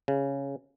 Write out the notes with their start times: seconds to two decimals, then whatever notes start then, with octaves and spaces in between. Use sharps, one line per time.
0.08 C#3